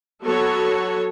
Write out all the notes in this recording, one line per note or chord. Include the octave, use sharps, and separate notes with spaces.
F#3 B3 F#4 A4 C#5